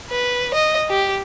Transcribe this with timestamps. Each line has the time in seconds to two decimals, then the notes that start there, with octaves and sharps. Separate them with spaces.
0.10 B4
0.54 D#5
0.90 G4